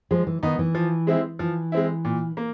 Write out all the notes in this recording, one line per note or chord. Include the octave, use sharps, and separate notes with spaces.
F3 G#3
E3
D#3 B3 D#4
E3
F3
G#3 C4 E4
E3 F3
G#3 C4 E4
A#2
A#3